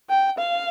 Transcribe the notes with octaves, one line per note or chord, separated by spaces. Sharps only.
G5
F5